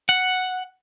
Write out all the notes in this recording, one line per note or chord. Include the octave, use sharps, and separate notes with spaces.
F#5